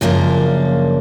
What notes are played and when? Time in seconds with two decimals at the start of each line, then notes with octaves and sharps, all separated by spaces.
0.01 F#2 C#3 F3 A#3 D4